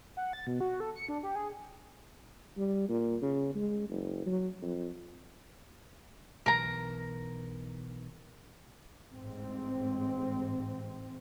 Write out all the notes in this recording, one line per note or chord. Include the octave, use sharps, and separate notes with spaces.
F#5
A6
B2
F#4
A4
C#7
D4
G4
G#4
G3
A#2
C#3
G#3
F#1
F#3
F2
B1 E3 A#4 A#5
A1 G#2 C4